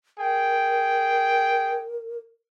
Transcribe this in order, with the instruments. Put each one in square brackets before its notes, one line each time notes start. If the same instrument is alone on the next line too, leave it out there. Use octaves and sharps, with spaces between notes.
[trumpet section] G#4 G5 [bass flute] A#4